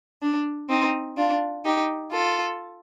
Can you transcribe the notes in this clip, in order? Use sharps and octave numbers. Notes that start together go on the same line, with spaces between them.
D4
C4 D#4
D4 F4
D#4 G4
F4 A4